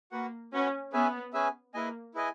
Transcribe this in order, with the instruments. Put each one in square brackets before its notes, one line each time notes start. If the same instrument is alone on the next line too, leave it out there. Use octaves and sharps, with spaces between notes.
[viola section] A#3 [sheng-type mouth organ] F#4 B4 F#5
[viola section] C#4 [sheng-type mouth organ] F#4 B4 F#5
[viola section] B3 [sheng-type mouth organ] C#4 G#4 B4 E5 G#5
[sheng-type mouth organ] C#4 G#4 B4 E5 G#5
[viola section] A#3 [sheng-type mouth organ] E4 G#4 B4 D#5 G#5
[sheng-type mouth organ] E4 G#4 B4 D#5 G#5